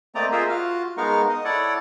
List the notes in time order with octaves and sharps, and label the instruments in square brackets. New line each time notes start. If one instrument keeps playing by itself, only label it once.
[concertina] A3 A#3 C4 D5 D#5 A#5
F4 G#4 A#4 C5 D#5 E5
F4 F#4 F5
G#3 B3 D#4 A#4 F5 C#6
D#5
E4 A4 C#5 D5 F#5